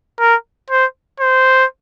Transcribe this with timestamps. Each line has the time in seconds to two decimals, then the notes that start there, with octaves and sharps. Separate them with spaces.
0.20 A#4
0.70 C5
1.20 C5